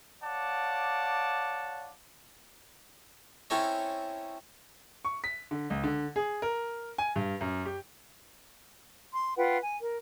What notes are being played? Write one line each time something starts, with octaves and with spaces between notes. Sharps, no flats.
C#5 D5 F5 F#5 A5 D6
C4 C#4 E4 A4 C#5 D#5
C#6
B6
D3
C#2
D3
G#4
A#4
G#5
G2
F#2
G4
C6
F4 B4 F#5 G5
G#5
A#4